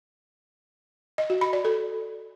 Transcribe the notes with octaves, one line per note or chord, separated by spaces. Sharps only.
D#5
F#4
B5
D5
A4